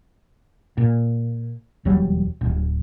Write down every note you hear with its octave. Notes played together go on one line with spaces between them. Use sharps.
A#2
E1 D#2 F#3 G3
D1